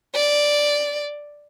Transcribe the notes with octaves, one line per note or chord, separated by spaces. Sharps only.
D5